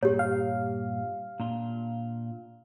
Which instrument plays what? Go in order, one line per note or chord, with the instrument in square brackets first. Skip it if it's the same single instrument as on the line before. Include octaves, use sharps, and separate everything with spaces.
[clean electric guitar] G2 A#2 [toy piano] G4 C#5
[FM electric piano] F5
[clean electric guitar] A#2 D4 F4